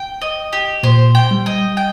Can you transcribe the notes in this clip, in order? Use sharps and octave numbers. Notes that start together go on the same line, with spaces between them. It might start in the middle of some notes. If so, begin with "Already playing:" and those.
Already playing: G5
D#5
G4
A#2 C5
G5
G3
D#5
G5